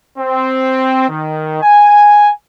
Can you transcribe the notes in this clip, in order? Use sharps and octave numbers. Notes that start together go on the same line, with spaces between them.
C4
D#3
G#5